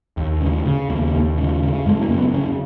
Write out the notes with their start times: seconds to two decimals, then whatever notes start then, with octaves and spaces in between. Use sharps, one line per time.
0.17 D#2
0.41 C#3
0.65 C#3
0.89 D#2 A#3
1.14 D#2
1.38 C#3
1.62 C#3
1.86 F#2 G#3
2.02 A#3
2.10 F#2
2.18 B3
2.34 C#3 C#4